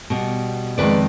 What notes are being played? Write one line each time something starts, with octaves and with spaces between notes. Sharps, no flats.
B2 G3
F2 D#3 G#3 B4 D5